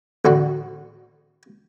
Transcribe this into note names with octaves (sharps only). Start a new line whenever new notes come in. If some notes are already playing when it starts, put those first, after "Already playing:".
A1 D3 F#4